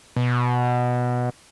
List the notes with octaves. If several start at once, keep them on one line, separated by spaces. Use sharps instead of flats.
B2